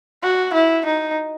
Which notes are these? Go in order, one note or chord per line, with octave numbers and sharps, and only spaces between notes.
F#4
E4
D#4